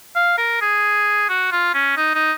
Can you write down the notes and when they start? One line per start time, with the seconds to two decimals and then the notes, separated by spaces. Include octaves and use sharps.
0.15 F5
0.38 A#4
0.61 G#4
1.29 F#4
1.52 F4
1.74 C#4
1.97 D#4
2.14 D#4